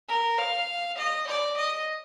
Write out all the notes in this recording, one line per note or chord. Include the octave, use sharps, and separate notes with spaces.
A#4
F5
D#5
D5
D#5